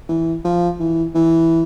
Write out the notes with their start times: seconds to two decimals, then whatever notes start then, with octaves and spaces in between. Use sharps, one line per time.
0.09 E3
0.44 F3
0.80 E3
1.15 E3